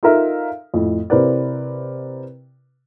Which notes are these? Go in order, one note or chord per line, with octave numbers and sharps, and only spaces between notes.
D#4 F4 A4 A#4 E5 F5
F2 A2
C3 C4 E4 A#4 B4 D5